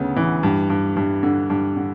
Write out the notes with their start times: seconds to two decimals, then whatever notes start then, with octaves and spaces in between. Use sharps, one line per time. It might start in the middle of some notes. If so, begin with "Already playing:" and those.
Already playing: D2 C#3 B3
0.16 E3
0.43 G2
0.70 G2
0.96 G2
1.23 D3
1.50 G2
1.76 D3